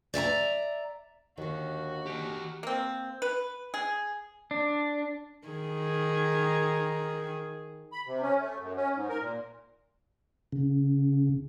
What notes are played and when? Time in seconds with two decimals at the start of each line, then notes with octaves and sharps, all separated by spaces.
0.14 D5 E5 G5 A#5
1.37 D#2 D3 D#3 F#4
2.06 G4 D#5
2.63 A#3 C4
3.22 B4
3.74 G#4
4.51 D4
5.48 D#3 G#4
7.92 B5
8.06 C3
8.22 C#4
8.40 A3
8.59 F#2
8.76 C#4
8.95 G#2
9.09 A#4
9.21 A#2
10.52 C#3